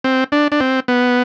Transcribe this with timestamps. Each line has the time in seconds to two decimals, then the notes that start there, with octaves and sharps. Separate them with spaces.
0.04 C4
0.32 D4
0.52 D4
0.60 C4
0.88 B3